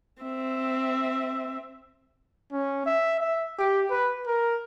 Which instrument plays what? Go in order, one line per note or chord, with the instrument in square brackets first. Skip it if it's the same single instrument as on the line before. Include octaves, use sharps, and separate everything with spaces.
[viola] C4 E5
[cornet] C#4
E5
E5
G4
B4
A#4